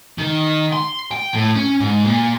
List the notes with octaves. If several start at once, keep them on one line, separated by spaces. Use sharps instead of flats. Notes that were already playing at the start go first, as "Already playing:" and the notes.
D#3
C6
G5
A2
C#4
G#2
A#2